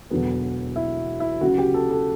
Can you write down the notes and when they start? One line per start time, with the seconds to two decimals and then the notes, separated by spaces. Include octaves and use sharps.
0.10 E1 E2 D3 F#3 B3
0.76 E4
1.20 E4
1.41 D2 C#3 F#3 F#4
1.58 G4
1.74 A4
1.90 A4